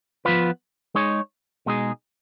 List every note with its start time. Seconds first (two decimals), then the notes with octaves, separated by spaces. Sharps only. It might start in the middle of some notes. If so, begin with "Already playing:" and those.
0.25 F3 B3 F4 B4
0.95 G#3 D#4 G#4 C#5
1.66 B2 G#3 D#4 G#4